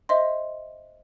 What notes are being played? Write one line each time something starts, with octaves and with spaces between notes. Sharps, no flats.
C5 D#5 E5 C6